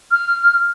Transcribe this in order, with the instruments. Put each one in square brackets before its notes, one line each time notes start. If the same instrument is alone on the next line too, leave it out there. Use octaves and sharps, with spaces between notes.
[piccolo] F6